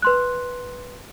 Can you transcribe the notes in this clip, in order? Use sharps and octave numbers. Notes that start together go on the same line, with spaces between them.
B4 C6 F#6